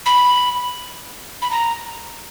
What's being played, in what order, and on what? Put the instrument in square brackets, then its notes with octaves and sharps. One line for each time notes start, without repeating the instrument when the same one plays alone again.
[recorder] B5
B5
A#5